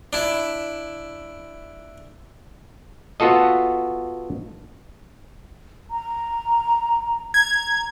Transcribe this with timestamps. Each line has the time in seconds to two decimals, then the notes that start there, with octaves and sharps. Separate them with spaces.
0.13 D4 E4
3.20 B3 F4 F#4 A4 D#5
5.91 A#5
7.34 A#5 G#6